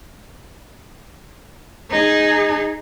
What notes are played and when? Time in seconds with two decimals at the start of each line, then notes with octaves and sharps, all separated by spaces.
1.90 D#4 G#4